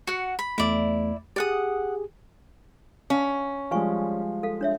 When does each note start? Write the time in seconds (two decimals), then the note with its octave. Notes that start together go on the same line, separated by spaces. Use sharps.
0.07 F#4 F#5
0.39 B5
0.58 E2 A3 E4 D5
1.36 G4 G#4 D5 F#5 D#6
3.10 C#4 F5
3.71 F3 G3 G#3 B4 G#5 C#6
4.43 A4 F5
4.61 D4 C#5 E5